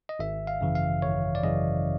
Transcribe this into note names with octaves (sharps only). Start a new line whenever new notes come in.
D#5
G#1 E5
F5
F#2 C#3 E3
F5
G#1 C#5
D5
F#2 C#3 E3 D#5